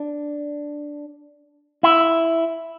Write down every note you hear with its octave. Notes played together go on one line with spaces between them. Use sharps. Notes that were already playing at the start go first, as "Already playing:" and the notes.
Already playing: D4
E4